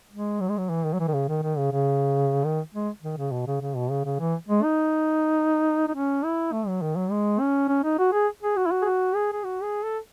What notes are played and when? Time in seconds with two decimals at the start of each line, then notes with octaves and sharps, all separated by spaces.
0.12 G#3
0.41 F#3
0.50 G#3
0.58 F#3
0.70 E3
0.85 D#3
0.94 F#3
1.00 E3
1.08 D#3
1.14 C#3
1.29 D#3
1.43 D#3
1.58 C#3
1.72 C#3
2.45 D#3
2.74 G#3
3.03 D#3
3.18 C#3
3.32 B2
3.47 C#3
3.61 C#3
3.77 B2
3.91 C#3
4.05 C#3
4.20 E3
4.49 G#3
4.63 D#4
5.88 D#4
5.94 C#4
6.24 E4
6.52 A3
6.68 F#3
6.82 D#3
6.96 F#3
7.11 G#3
7.40 C#4
7.69 C#4
7.84 D#4
7.99 F#4
8.13 G#4
8.42 G#4
8.57 F#4
8.66 E4
8.72 F#4
8.82 G#4
8.85 F#4
9.15 G#4
9.32 G#4
9.44 F#4
9.63 G#4
9.83 A4